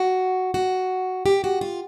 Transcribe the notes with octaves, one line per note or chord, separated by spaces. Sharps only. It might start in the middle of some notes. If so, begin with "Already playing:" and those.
Already playing: F#4
F#4
G4
F#4
F4